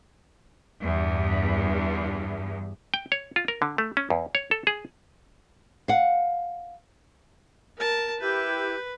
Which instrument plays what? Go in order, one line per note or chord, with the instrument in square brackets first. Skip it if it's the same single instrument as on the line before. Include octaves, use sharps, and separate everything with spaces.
[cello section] E2 G2
[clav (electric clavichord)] G5
C#5
F4
A#4
D3
A3
C#4
E2
C#5
A4
G#4
[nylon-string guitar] F5 F#5
[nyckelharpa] A#4 A5
[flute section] E4 G4 G6 [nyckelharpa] B4